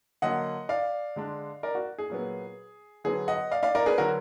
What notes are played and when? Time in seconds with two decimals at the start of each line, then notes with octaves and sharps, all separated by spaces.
0.22 D3 F#3 A#3 D#5 F#5
0.69 D5 F5
1.16 D3 G#3 D4
1.63 A#4 D5
1.75 F#4
1.98 G#4
2.10 A#2 F#3 B3
3.04 D3 F#3 B3 G#4
3.28 D#5 F#5
3.51 D5 F5
3.63 D5 F5
3.75 A#4 D5
3.86 G#4 B4
3.98 D3 F#3 F#4 A#4